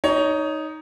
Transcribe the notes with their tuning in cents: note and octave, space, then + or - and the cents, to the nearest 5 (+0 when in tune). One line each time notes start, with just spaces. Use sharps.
D#4 +0 C#5 +20